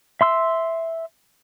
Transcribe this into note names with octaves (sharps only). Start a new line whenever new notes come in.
E5 C6 E6